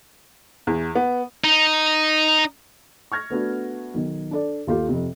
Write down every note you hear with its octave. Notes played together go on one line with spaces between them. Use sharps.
E2
B3
D#4
C#6 F6 G#6 A#6
A3 B3 D4 F#4
B1 D#3
D4 A4 D5
D#2 F4 G4 A4
F2 C3